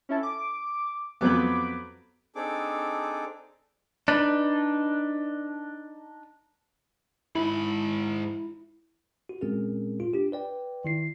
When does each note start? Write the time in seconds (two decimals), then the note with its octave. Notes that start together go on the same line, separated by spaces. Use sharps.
0.09 C#4 E4 A4
0.23 D6
1.21 F2 F#3 B3 B5 D6
2.35 C4 D4 D#4 G#4 A4 D6
4.08 D4 D#4 B4
7.35 G#2 E4 B5
9.29 F#4
9.41 A#2 G#3 C4 C#4 G#4 A#4
10.00 F4
10.14 D4 G4
10.32 B4 D5 G5
10.85 D#3 E4 C7